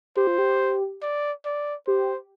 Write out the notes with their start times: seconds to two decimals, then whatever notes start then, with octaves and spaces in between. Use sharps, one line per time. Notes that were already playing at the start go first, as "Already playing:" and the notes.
0.16 G4 C5
0.27 F4
0.38 G4
1.02 D5
1.45 D5
1.87 G4 C5